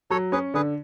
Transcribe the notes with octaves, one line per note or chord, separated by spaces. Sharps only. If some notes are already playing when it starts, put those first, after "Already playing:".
F#3 A4 C#5
C#4 G#4 B4
D3 G#4 B4